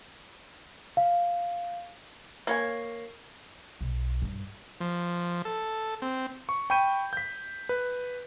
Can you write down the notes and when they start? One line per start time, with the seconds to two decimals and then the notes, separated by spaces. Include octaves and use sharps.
0.97 F5
2.47 A#3 C#5 G#5
3.81 B1
4.22 G2
4.81 F3
5.45 A4
6.02 C4
6.49 C#6
6.70 G5 B5 C#6 G6 D#7
7.13 G6 B6
7.69 B4